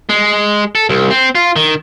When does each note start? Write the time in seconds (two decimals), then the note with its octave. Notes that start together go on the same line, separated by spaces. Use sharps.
0.09 G#3
0.75 A4
0.89 C2
1.10 C4
1.35 F4
1.56 D#3